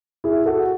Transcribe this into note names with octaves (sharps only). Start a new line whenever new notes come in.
E4 G#4
F#4 A4